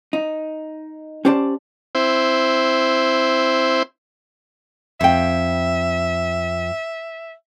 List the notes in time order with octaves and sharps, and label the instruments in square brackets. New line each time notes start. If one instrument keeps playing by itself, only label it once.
[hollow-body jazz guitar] D#4
C#4 G4 C5 D5 A5
[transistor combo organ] C4 E4 C5
[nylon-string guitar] F2 G5 [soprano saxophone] E5